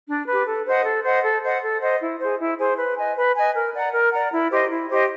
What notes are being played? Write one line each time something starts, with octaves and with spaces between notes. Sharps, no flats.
D4
G4 B4
A4
C5 D#5 F#5
A4
C5 D#5 F#5
A4
C5 D#5 F#5
A4
C5 D#5 F#5
E4
G#4 C5
E4
G#4 C5
B4
D#5 G#5
B4
D#5 G#5
A#4
D5 F#5 A#5
A#4
D5 F#5 A#5
E4
G4 C5 D#5
E4
G4 C5 D#5